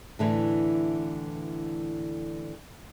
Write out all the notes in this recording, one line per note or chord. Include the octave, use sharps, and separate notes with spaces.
A2 D3 E3